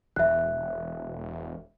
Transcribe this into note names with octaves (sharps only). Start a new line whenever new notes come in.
E1 E5 F#6